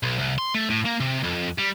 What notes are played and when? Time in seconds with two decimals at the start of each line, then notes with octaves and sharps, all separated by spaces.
0.03 B1
0.19 C2
0.38 C6
0.54 A3
0.70 A2
0.86 A#3
1.00 C3
1.24 F2
1.59 G3